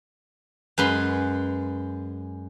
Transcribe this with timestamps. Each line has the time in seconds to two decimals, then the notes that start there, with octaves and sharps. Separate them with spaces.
0.78 F#2 G#3 B4 C6